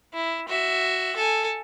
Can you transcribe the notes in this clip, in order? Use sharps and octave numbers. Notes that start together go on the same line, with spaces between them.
E4
F#4 E5
A4 G#5